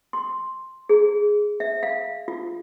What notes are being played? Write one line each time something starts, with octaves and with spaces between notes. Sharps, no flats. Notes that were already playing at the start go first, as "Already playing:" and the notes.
C6
G#4
E5
F5
F4